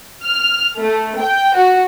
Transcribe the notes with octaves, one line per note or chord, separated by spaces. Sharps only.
F6
A3
G5
F#4